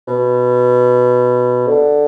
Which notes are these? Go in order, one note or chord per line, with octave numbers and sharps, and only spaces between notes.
B2
D3